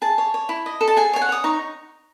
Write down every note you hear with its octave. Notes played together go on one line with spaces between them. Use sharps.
G#4 A5
C#5
C#5
E4
D#5
A4
A5
G#4 G#5
C#5 G#5
F#5
C#5 D#6
D#4 C#6